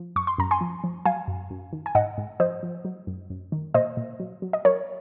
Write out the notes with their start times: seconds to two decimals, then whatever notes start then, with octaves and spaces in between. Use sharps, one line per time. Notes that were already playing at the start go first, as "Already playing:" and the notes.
Already playing: F3
0.16 F#2 C#6
0.27 C6
0.38 F#2 A#5
0.51 G#5 C6
0.61 F3
0.84 F3
1.05 F#3 F5 G#5
1.28 F#2
1.50 F#2
1.73 D#3
1.86 G#5
1.95 G#2 D#5 F#5
2.18 G#2
2.40 F3 C5 D#5
2.63 F3
2.85 F#3
3.07 F#2
3.30 F#2
3.52 D#3
3.74 A#2 C5 D#5
3.97 A#2
4.20 F#3
4.42 F#3
4.53 D#5
4.65 F#3 A#4 C#5